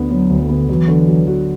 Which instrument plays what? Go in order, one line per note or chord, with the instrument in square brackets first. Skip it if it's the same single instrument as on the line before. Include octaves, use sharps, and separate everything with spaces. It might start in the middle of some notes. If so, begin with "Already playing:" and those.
Already playing: [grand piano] D2 D3 B3
[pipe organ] F#3 [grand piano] B3
[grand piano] D2
[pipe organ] D3
[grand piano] B3
[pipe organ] E3 [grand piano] F#3
[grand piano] D3
F#3
F#4